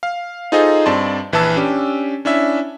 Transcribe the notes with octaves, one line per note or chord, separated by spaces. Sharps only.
F5
D#4 F4 G#4 A4 C5 D#5
G2 C4 D5 A5 C6
A#1 E3 E4 B4 A5 E6
C#4 D4 G4
C#4 D4 E4 E5